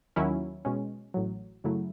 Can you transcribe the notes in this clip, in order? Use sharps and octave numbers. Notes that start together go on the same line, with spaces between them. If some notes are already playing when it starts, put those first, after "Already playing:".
D#2 D#3 F#3 C#4 E4
B2 G#3 C#4
A1 A2 F#3
F#2 C#3 F#3 A3 E4